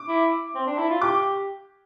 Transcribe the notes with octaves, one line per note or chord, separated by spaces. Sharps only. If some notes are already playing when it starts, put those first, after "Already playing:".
Already playing: D6
E4
C4
D4
E4
F4
G4 D6